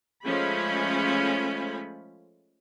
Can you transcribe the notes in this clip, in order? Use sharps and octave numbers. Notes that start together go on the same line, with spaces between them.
F3 G#3 A3 C#4 B5